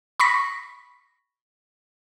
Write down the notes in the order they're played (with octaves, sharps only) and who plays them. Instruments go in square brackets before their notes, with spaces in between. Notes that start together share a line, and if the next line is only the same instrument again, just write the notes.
[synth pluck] B5 C#6 A#6 B6